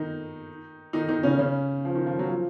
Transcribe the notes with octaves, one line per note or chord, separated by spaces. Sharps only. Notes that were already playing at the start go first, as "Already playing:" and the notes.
Already playing: D#3 D#4
D#3 D#4
D#3 D#4
C#3 C#4
C#3 C#4
F3
D#3
F3
F#3
F3